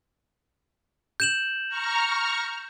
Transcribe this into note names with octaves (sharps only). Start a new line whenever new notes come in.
G6 E7 F#7
A#5 C#6 F6